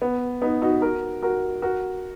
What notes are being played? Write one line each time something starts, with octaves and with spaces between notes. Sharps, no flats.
B3
B3 D#4
D#4 F#4
F#4 A#4
F#4 A#4
F#4 A#4